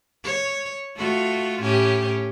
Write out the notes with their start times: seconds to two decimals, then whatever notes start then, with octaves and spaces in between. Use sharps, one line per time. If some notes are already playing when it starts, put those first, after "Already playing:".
0.23 C#5
0.96 A3 F4 F#4
1.62 A2 C#4 G4